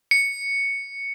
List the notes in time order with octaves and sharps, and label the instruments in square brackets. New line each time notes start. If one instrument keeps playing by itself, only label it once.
[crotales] C#7